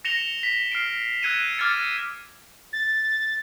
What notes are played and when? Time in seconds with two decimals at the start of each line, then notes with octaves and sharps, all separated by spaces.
0.05 A#6 C#7 E7 F7 G7
0.43 B6
0.72 F6 C7 D7
1.22 E6 F#6 G#6 C#7 D#7 E7
1.58 D6 F6 G#6 A6 C#7
2.73 A6